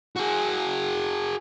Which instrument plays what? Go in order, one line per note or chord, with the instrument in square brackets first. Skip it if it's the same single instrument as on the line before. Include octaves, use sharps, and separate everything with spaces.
[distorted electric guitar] F#4 G#4